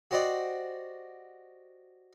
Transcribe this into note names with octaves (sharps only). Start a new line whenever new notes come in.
F#4 G4 C5 D5 D#5 F#5